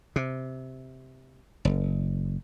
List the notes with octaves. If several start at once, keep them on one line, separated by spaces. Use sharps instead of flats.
C3
F#1